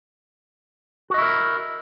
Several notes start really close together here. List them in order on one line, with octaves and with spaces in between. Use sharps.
F#4 D#5 E4 A#4